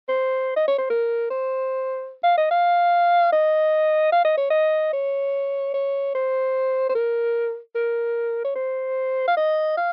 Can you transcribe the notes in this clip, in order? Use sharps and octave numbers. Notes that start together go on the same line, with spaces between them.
C5
D#5
C#5
C5
A#4
C5
F5
D#5
F5
D#5
F5
D#5
C#5
D#5
C#5
C#5
C5
C5
A#4
A#4
C#5
C5
F5
D#5
F5